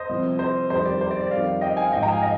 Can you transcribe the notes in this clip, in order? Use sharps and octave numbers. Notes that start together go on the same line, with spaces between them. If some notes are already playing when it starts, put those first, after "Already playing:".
Already playing: C5 D#5
C2 C3 F3
C5
F2 D#3 G3 C5
D5
C5
D5
D5
F2 D#3 G3 D5 F5
D#5 G5
F5 G#5
G#2 F3 D#5 G5
G5 A#5
F5 G#5
D#5